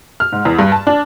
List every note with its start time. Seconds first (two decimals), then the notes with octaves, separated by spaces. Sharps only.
0.20 F6
0.32 G#2
0.45 E2
0.59 G2
0.72 A5
0.87 D4